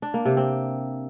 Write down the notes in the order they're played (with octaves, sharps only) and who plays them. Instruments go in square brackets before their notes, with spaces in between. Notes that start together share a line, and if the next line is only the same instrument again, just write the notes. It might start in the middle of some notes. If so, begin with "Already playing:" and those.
[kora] D4
A#3
C3
C4